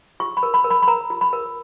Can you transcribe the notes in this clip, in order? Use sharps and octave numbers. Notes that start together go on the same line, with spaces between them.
F4 C#6
B5
A#4
B5
A#4
B5
B5
A#4 A#5
F4
B5
A#4